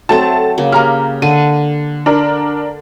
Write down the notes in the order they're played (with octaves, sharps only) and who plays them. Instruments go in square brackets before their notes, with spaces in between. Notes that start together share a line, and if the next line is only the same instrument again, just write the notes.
[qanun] F#3 C4 [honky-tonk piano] A3 A5
[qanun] C#3 A#3
[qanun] A#3 G4 [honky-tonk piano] A#5 F6
[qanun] D3 [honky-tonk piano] D#7
[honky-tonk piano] D4 A#4